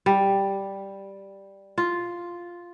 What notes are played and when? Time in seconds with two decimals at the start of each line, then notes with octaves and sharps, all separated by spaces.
0.06 G3
1.78 F4